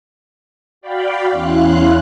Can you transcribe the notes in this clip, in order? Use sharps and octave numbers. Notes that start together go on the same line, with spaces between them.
F#4 D5 F5 G5 B5
E2 C#4 E4 F5 C6 F#6